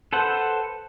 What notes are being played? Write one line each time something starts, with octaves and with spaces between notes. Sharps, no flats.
A4 B4 C5 F#5